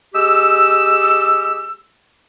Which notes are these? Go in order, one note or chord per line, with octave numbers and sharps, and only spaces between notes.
G#3 G4 D#6 E6